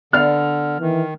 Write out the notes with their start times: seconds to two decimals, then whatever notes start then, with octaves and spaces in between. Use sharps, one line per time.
0.13 D3 B3 D5 F5 F6
0.80 D#3 E3